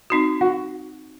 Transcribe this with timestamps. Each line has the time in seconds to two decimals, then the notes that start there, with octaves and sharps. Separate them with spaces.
0.10 C4 D#4 F#4
0.41 F#4